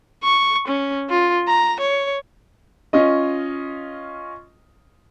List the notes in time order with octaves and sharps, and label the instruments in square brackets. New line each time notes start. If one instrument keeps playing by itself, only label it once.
[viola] C#6
C#4
F4
A#5
C#5
[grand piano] C#4 F4 D#5